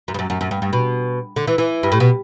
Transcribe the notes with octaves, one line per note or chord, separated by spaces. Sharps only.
F#2
G2
F#2
F#2
F#2
G2
G2
B2
D3
E3
E3
G2
A2
B2